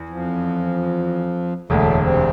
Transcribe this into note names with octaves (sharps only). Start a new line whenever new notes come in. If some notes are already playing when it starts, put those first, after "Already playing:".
Already playing: E2
F2 F3
E1 D2 A2 D3 A3
C3 C4